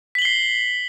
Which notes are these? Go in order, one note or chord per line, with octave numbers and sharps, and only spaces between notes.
B6 C7 F#7 G7